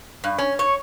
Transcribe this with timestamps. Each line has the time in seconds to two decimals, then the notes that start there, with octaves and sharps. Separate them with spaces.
0.24 G2
0.38 C#4
0.59 C#5